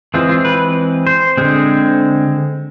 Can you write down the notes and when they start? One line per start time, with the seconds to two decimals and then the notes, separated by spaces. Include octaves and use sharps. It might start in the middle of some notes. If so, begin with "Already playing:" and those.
0.14 E3 G#3 C4 F4
0.29 F4
0.45 B4
1.07 C5
1.37 D3 G#3 C4